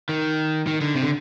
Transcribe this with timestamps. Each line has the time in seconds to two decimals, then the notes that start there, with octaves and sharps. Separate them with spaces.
0.09 D#3
0.67 D#3
0.81 D3
0.95 C3
1.03 D3